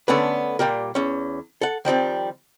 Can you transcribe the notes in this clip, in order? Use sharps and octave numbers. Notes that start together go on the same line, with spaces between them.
D3 A3 B3 C#4 D4 B4
A#2 G3 G4 A#4
E2 C#4
A4 F#5
D#3 F3 G3 C4